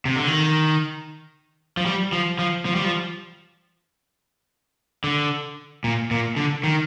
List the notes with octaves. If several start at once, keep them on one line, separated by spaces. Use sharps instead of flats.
C3
D3
D#3
F3
G3
F3
F3
F3
G3
F3
D3
A#2
A#2
D3
D#3